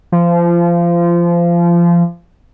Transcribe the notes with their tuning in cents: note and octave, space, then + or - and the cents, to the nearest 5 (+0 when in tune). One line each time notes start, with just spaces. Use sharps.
F3 -25